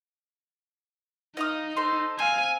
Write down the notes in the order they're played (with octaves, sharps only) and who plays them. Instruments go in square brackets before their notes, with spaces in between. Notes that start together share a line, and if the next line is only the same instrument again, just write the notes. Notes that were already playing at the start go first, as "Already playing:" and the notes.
[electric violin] D#4 [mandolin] D#5 F5 D#6
[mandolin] A4 C5 C6
[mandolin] C4 [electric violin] F5 G#5